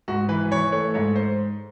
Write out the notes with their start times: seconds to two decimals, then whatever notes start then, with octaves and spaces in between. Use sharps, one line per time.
0.08 G#2 F#4
0.29 E3 B4
0.51 E3 C#5
0.72 A3 C#5
0.94 G#2 C#5
1.16 C5